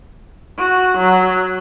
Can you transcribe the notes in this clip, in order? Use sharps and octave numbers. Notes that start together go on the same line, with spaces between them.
F#4
F#3